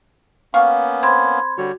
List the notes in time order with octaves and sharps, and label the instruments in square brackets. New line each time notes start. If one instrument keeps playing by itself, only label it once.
[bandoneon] A#3 B3 C#4 [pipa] F5 C#6
[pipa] C4 [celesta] B5 C6 G#6
[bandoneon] D3 G3 C#5 [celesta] F#4